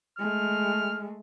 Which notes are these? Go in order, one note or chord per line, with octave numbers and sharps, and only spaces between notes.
G#3 A3 F6